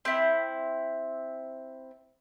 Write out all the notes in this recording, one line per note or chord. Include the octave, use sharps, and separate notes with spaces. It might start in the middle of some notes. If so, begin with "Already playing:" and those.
C4 E4